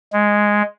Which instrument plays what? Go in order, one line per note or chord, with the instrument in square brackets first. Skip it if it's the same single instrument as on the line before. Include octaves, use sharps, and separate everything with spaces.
[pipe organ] G#3